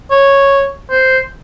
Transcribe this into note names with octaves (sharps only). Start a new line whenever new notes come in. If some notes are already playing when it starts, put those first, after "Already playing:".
C#5
C5